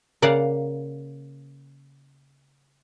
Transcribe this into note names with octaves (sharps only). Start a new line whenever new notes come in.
C#3 A#3 D5 F5 F#5